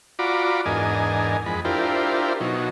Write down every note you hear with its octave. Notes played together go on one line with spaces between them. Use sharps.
F4 F#4 D5 A#5 B5 D6
E2 G#2 D4 A#4 D#5 G#5
F2 G#3 B5
D4 E4 F4 G4 A#4 C5
B2 F#3 D#4